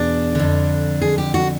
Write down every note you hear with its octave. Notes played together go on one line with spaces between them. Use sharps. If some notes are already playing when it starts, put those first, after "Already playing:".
Already playing: E2 B2 D4
F2 D3
G#4
G4
F#4